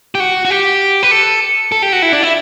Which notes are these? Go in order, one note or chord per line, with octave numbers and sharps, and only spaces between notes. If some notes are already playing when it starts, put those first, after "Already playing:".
G4
F#4
F#4
G4
B4
A4
A4
G4
F#4
E4
D4
E4